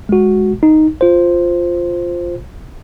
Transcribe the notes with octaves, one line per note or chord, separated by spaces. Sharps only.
G#3 F#4
D#4
F4 C5